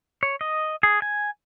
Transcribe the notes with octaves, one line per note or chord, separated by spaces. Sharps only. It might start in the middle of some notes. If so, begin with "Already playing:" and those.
C#5
D#5
G#4
G#5